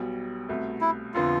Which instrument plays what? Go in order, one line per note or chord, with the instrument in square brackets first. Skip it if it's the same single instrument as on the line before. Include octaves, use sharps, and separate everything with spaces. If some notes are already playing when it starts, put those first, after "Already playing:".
Already playing: [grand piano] B1 B2 G3
C2 B2 A3
[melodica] E4
[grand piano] F1 D3 F3 B3 [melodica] F4